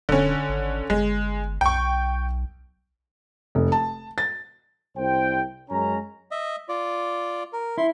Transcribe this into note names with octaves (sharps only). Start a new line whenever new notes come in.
D#1 D3 C#4
G#1
G1 G#3
B1 G5 C#6
F1
A5
A6
C2 C5 G5
F#2 G#3 C#4 A#5
D#5 E5
F4 D5
A#4
E4 C6